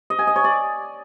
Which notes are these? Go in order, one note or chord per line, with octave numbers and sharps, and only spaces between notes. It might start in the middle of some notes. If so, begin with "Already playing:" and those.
D#5
G#5
D#5
C#5
D5